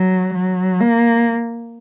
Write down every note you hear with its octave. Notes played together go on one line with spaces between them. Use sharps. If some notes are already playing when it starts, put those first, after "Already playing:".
Already playing: F#3
F#3
A#3